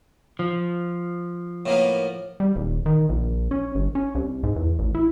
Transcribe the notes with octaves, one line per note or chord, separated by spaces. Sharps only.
F3
A2 A#3 B3
G3
D#1
D#3
A#1
C#4
G1
C#4
C2
G#2
E2
A1
E4